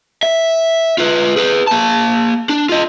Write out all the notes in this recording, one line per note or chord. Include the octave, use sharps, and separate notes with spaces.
E5
F4 B4
G#4 B4
A#3 A5
D4
F4 D#5